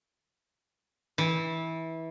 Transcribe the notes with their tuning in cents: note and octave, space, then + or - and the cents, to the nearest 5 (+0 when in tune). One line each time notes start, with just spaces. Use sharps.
E3 -20